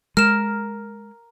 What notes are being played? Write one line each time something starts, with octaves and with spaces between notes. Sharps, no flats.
G#3 A#4 F6 E7